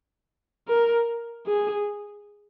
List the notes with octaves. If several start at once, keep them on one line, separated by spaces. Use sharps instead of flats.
A#4
G#4